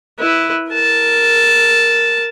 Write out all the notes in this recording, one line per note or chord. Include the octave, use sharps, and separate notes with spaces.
E4 B4
A#4 A5